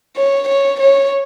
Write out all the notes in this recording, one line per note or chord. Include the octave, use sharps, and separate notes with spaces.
C#5
C#5
C#5